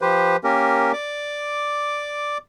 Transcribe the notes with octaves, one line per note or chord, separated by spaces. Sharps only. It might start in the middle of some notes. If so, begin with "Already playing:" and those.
F3 G4 B4 C5
A#3 C#4 G4 A#4
D5 D6